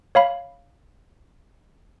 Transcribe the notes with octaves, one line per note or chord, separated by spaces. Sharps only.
C#5 F5 B5